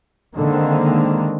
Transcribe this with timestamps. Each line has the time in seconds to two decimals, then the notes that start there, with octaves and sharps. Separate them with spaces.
0.35 D3 D#3 G#3 A#3 C4